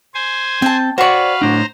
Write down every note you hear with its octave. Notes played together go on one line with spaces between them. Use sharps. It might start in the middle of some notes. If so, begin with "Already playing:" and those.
C5 G#5
C4 G5 A5
F#4 B4 C5 D5 F5 C#6
A2 D4 C5 A#5